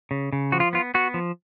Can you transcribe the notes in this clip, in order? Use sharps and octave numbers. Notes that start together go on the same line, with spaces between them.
C#3
C#3
F3 F#4
F4
B3 F4
B3 F#4
F3